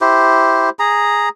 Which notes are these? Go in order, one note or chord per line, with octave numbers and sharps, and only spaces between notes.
E4 G4 C5
G#4 A#5